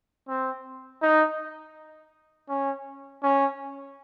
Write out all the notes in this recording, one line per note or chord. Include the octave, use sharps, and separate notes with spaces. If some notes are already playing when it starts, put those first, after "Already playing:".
C4
D#4
C#4
C#4